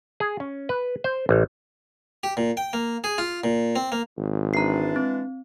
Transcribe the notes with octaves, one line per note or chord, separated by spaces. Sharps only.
G#4
C#4
B4
C5
A1
G4
A#2
G5
A#3
G#4
F4
A#2
C4
A#3
G#1
E3 G#3 D4 A#5 C7
C4